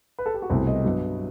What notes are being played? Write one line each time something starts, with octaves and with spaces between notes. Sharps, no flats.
B4
A4
G4
F#4
C2 B2 A3 C4 E4
D#5
G2 F#3 B3